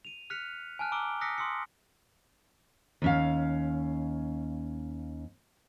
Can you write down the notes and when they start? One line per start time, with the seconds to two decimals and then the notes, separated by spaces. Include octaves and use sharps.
0.05 D#7 F7
0.30 F6 F#6 B6 C#7 F7
0.79 G#5 A5 F6 F#6
0.92 A#5 D6 E6 D7 G7
1.21 D#6 E6 F#6 A#6 B6 C#7
1.38 C6 D#6 E6 C#7
3.02 D#2 C#4 F5